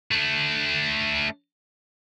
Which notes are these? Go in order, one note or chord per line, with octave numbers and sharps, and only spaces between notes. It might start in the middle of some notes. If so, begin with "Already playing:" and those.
A3 D4